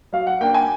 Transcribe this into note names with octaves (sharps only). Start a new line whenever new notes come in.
F#3 F5
F#5
A#3 D4 G5
G#5